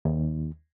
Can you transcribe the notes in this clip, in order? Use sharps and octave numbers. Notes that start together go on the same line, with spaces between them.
D#2